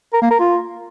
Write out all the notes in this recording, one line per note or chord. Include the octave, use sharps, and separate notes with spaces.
A#4
A#3
A#4
F4